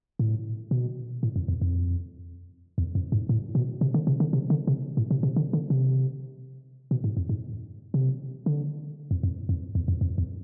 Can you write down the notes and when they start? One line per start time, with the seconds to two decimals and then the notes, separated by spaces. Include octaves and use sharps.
0.19 A2
0.71 B2
1.23 A2
1.36 F2
1.48 E2
1.62 F2
2.78 E2
2.95 F2
3.12 G#2
3.29 A2
3.55 B2
3.81 C3
3.94 D3
4.07 C3
4.20 D3
4.33 C3
4.50 D3
4.67 C3
4.97 A2
5.11 C3
5.23 C3
5.36 D3
5.53 D3
5.70 C3
6.91 B2
7.04 G#2
7.17 F2
7.29 G#2
7.94 C3
8.46 D3
9.11 F2
9.23 F2
9.49 F2
9.75 E2
9.88 F2
10.01 F2
10.18 E2